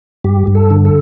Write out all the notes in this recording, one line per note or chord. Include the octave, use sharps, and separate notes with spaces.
G2 G4
G2
A4
D3
A4